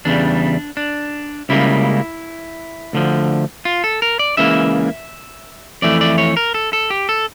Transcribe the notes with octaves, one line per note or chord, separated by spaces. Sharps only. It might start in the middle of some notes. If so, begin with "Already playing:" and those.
E2 C#3 G3 D4
D4
C#2 C#3 G3 A#3 E4
D2 D3 F3
F4
A4
A#4
D5
C#2 C#3 E3 A#3 E5
F2 E3 A3 D5
D5
C#5
A#4
A4
A4
G4
A4